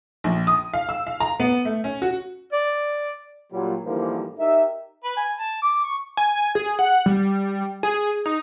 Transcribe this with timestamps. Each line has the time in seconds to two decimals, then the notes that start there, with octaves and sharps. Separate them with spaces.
0.24 A#1
0.47 D#6
0.74 F5
0.89 E6
1.07 F5
1.20 A#5
1.40 B3
1.65 A3
1.84 C#4
2.02 F#4
2.53 D5
3.52 A#2 F#3 G3
3.84 G#2 D3 E3 F3 G3 A#3
4.39 D#4 G4 A#4 E5
5.04 B4
5.17 G#5
5.39 A5
5.62 D6
5.84 C#6
6.17 G#5
6.55 G#4
6.79 F#5
7.06 G3
7.83 G#4
8.26 D#4